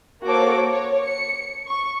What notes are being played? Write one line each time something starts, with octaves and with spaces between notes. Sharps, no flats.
A#3 F#4 A4 C5 C#5 D6
C#5
C#7
C#6